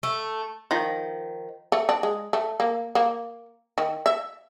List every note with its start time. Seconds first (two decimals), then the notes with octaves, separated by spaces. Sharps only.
0.03 A3
0.71 D#3 F3
1.72 A3
1.89 D4
2.03 G#3
2.33 A3
2.60 A#3
2.95 A#3
3.78 D#3
4.06 E5